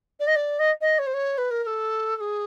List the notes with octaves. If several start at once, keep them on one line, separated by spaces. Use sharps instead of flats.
D5
D#5
D5
D#5
D#5
C#5
C5
C#5
B4
A#4
A#4
A4
A4
G#4